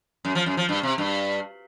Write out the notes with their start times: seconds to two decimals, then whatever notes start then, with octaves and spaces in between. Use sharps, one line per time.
0.25 F#2
0.35 F3
0.46 F#2
0.57 F3
0.69 G2
0.83 C3
0.98 G2